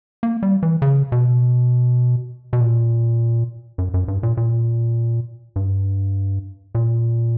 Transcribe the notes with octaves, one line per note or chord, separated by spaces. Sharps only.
A#3
G3
E3
C#3
B2
B2
A#2
F#2
F#2
G2
A#2
A#2
G2
A#2